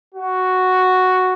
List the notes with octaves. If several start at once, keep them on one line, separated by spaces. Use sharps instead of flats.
F#4